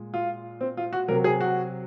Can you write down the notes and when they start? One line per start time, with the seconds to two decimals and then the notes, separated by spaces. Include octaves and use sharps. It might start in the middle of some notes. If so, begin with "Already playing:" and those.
Already playing: A#2 G#3
0.14 F4
0.61 C4
0.77 F4
0.93 F#4
1.08 C3 F#3 A#4
1.24 G#4
1.41 F#4